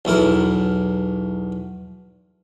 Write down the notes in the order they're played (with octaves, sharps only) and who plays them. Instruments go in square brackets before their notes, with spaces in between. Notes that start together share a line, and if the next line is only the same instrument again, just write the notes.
[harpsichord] B1 E2 E4 A#4